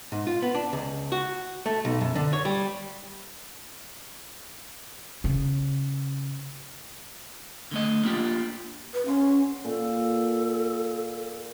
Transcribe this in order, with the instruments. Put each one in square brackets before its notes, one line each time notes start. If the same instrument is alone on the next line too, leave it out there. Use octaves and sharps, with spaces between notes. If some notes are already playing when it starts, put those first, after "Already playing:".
[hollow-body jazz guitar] G#2
F4
B3
D4
C#2
F#4
A3
B1
F#2
D3
C#5
G3
[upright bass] C#3
[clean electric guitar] D3 A3 D#5
A#3 D4 F4 G4
[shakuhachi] B4
[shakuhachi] C#4 [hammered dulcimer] F#5 C6 C#6
[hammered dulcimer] A#2 [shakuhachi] A4